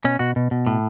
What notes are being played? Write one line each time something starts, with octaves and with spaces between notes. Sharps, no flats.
B2 C#4
B2 F#4
B2
B2
A2